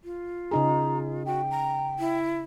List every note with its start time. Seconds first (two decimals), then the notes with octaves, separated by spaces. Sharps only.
0.04 F4
0.51 C#3 D#4 G#4 A#5
1.26 F#4 G5
1.51 A#5
1.99 E4